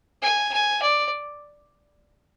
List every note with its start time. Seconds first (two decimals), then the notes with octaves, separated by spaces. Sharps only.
0.22 G#5
0.53 G#5
0.82 D5